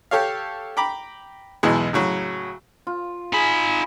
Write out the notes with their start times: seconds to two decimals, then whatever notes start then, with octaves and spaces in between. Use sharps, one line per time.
0.11 G4 A4 C#5 F5
0.77 G5 A#5 B5 D6
1.63 B1 E2 B2 E3 G#3
1.93 A2 C#3 F#3
2.87 F4
3.33 D#4 G#4 B5